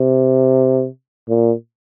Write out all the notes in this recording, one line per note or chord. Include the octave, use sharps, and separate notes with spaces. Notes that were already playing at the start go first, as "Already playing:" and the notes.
Already playing: C3
A#2